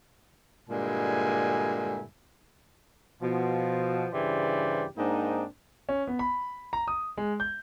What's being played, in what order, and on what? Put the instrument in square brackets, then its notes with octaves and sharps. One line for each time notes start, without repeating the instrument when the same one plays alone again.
[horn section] G2 A#2 D3 G#3 E4 G#5
B2 F3
G2 C#3 E3 G4 C5 D5
G#2 A#3 C4 D4 D#4
[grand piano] C#4
B3
B5
A#5
D#6
G#3
G6